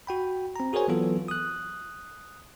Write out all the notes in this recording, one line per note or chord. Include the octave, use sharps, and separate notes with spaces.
F#4 G5 B5
C4 A#5
F#4 G#4 A#4 C5 C#5 G#5
E3 F#3 B3 F4 A4
D#6 F#6